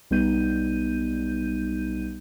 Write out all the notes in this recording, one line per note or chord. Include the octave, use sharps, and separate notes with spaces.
B1 G3 B3 D#4 G6 D#7